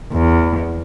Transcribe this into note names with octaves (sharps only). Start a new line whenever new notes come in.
E2